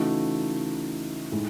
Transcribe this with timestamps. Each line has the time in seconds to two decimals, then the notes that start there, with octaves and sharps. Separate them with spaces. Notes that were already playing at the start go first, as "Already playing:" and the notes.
Already playing: C#3 E3 A3 D#4 F#4
1.32 A2 G#3 D#4